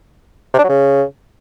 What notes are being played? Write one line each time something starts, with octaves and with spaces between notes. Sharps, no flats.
C3
D4
F#3
C#3